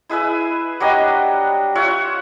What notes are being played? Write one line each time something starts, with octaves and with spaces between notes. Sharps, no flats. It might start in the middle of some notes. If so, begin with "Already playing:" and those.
E4 G#4 B4 E5
F#3 G3 D4 D#5
F4 C#5 E5 F#5